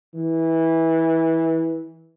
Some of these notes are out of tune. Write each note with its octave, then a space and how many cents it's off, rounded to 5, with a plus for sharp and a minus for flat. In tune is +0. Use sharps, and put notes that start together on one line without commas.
E3 -15